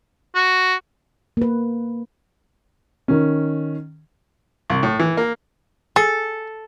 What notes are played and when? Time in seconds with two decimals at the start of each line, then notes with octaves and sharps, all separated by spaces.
0.35 F#4
1.37 A#3 B4
3.08 D#3 C#4
4.70 C2
4.83 A2
4.99 E3
5.17 A#3
5.96 G#4 A4